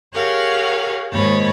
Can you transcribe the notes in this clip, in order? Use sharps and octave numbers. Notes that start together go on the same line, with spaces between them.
G4 G#4 A#4 C#5 F5 F#5
D#2 G#2 C#5 B5 A6